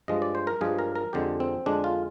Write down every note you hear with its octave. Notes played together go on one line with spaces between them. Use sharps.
G2 F3 G#3 D#5
D5
C5
A#4
G2 F3 G#3 G#4
A#4
A#4
F2 D3 G#3 G4
C4
F2 D3 G#3 D4
F4